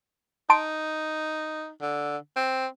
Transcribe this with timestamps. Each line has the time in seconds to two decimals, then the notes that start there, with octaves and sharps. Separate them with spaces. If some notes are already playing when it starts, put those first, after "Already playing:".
0.50 D#4 A5 C6 D7
1.81 D3
2.36 C4